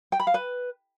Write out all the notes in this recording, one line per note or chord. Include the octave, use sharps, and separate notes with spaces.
G5
B5
F5
B4